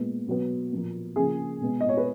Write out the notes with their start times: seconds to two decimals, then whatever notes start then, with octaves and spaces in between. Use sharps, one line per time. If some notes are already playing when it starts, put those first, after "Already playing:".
Already playing: A#2 G#3 B3
0.27 B2 F#3 B3
0.72 A#2 F3 A#3
1.16 C#3 F3 A#3 G#4
1.61 B2 G#3 B3
1.81 D#5
1.89 C#5
1.97 B4